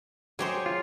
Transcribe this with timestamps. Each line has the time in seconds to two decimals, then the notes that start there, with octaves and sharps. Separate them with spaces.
0.39 F#3 G4 G#4 C5 C#5
0.66 F4